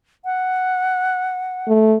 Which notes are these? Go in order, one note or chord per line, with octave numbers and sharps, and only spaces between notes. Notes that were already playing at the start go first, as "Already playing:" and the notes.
F#5
A3